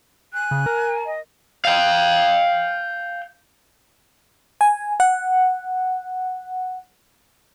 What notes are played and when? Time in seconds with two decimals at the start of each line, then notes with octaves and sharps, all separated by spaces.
0.33 G#5 F#6
0.51 C#3
0.66 A#4
1.06 D#5
1.65 F5 G5
4.61 G#5
5.00 F#5